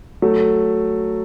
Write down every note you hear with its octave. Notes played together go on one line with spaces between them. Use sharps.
F#3 A3